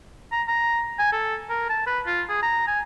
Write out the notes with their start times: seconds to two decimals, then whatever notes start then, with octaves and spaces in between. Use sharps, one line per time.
0.32 A#5
0.48 A#5
0.99 G#5
1.13 A4
1.50 A#4
1.70 A5
1.87 B4
2.07 F4
2.29 G#4
2.43 A#5
2.68 G#5